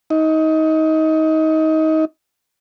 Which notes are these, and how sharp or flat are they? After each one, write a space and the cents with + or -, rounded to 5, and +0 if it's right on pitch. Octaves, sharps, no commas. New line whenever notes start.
D#4 +25